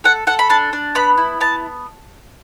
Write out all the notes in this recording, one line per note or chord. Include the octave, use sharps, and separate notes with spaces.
A4 F#5
A4 F#5
B5
D4 A5
D4
B3 B5
E4
B3 A5